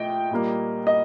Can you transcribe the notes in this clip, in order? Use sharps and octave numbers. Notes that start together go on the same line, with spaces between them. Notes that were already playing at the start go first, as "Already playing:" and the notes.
Already playing: A#2 A3 D#5 G5
A#2 G3 A#3
D#5